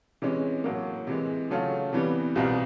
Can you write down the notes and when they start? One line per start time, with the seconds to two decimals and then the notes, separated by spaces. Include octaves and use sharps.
0.22 C3 E3 G#3 C#4
0.64 A2 F#3 A#3
1.07 C3 E3 G#3
1.50 C#3 F#3 A3 C#4 F4
1.92 C3 E3 G3 B3
2.36 C2 B2 G3 C4 F4